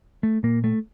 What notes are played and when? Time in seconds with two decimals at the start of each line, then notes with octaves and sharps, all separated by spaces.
0.23 A3
0.43 A#2 A#3
0.64 A3